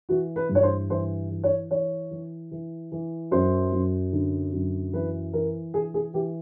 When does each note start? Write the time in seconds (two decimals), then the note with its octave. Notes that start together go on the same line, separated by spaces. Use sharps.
0.09 E3 F#4
0.36 B4
0.49 G2
0.55 C#5
0.63 C5
0.90 E3 C5
1.30 E3
1.44 C#5
1.70 E3 C#5
2.11 E3
2.51 E3
2.92 E3
3.31 F#2 C5
3.72 F#2
4.13 D3
4.53 F#2
4.93 E3 B4
5.33 E3 A#4
5.73 E3 G#4
5.94 G#4
6.14 E3 G4